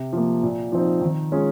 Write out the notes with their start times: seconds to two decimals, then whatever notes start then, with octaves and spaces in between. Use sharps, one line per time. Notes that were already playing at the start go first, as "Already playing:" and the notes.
Already playing: C3
0.13 F3 A#3
0.43 A#2
0.72 F3 C4 D#4
1.02 D#3
1.32 G#3 C#4 F4 G#4